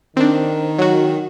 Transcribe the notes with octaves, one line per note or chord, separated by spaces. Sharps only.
D#3 C4 D4
F#3 F#4